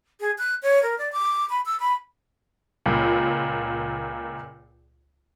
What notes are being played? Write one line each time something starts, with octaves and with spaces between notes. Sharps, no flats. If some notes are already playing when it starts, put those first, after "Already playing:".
G#4
F#6
C#5
A#4
D5
D6
B5
E6
B5
C#2 A#2